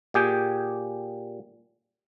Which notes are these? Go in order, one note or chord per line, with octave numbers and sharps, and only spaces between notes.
A#2 G4 G#4 G5